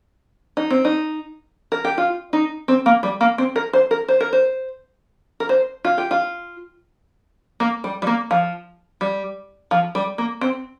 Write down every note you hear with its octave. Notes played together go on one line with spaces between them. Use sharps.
D#4
C4
D#4
A#4
G4
F4
D#4
C4
A#3
G3
A#3
C4
A#4
C5
A#4
C5
A#4
C5
A#4
C5
F4
G4
F4
A#3
G3
G3
A#3
F3
G3
F3
G3
A#3
C4